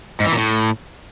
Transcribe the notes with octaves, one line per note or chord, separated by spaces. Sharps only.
G#2
E3
A#2
A2